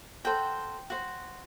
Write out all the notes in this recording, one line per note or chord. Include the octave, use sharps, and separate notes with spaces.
F#4 A4 C5 G5
F#4 C5